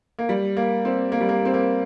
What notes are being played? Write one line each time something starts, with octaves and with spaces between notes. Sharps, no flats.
A#3
G3
A#3
C4
A#3
G3
A#3
C4
A#3